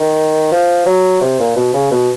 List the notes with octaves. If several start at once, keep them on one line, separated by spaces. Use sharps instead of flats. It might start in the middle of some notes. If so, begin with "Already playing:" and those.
Already playing: D#3
F3
F#3
C3
A#2
B2
C#3
B2